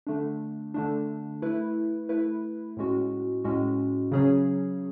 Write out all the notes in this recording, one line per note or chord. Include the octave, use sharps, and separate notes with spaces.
D3 A3 D4
D3 A3 D4
A3 E4 B4
A3 E4 B4
A2 G#3 C#4 F#4
A2 G#3 C#4 F#4
C#3 F#3 C#4 G#4 C#5